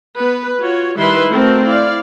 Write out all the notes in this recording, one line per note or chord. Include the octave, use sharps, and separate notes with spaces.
B3 B4
F4 F#4 C#5
D#3 G3 E4 B4 E5 C6
A3 C4 F#4 A#4 A5
E4 D5 F5